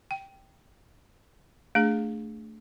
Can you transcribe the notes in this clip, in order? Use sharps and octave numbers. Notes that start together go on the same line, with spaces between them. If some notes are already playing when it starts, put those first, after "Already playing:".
G5
A3 D4 G#4